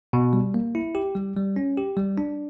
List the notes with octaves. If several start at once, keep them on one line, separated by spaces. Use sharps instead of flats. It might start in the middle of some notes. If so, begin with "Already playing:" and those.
B2
G3
A#3
E4
G4
G3
G3
C#4
G4
G3
D4